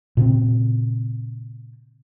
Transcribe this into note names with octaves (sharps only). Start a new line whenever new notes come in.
A#2 C#3 C4